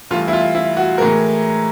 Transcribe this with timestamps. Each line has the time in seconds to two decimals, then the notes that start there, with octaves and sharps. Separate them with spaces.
0.11 G2 E3 A3 F4
0.28 E4
0.33 F4
0.55 E4
0.77 F#4
0.98 A2 E3 G#3 A#4